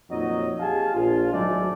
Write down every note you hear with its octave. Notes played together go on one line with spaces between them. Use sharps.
F2 A#2 F#3 D#4 D#5
G4 G#4 F5 G#5 A5
A#1 F4
G#1 F#3 G#3 A3 D5